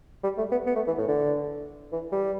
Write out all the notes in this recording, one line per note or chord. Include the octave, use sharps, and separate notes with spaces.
G3
A3
B3
B3
A3
E3
A2
D3
E3
G3